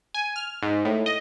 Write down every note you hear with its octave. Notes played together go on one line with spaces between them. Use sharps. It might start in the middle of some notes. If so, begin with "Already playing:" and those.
G#5
F6
G#2
A2
D#5